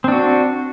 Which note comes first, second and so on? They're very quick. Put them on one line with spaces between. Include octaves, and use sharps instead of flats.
C4 D4 F#4